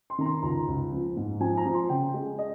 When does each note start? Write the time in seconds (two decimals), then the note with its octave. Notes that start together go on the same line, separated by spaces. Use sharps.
0.10 C6
0.18 D#3 A#5
0.25 C6
0.42 C#2 A#5
0.68 C#2
0.92 F3
1.16 G#2
1.40 F3 G#5
1.57 A#5
1.65 F3
1.74 C6
1.89 C#3 G5
2.14 G#3
2.39 D#5